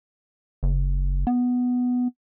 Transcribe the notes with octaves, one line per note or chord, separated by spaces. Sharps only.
F#1
B3